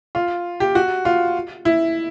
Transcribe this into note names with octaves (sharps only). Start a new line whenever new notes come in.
F4
G4
F#4
F4
E4